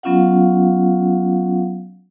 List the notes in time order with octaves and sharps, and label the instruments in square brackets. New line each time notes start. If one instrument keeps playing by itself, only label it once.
[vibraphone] F#3 B3 C#4 F4 F5 F#5